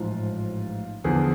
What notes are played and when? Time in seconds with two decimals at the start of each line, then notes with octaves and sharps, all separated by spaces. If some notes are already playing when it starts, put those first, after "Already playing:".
Already playing: A1 G#2 F3 F4
1.04 E2 D3 F3 G#4